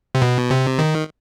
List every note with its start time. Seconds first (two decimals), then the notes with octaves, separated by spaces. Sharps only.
0.15 C3
0.22 B2
0.51 C3
0.79 D#3